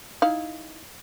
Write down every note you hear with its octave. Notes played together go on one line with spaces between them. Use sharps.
D#4 E4 F5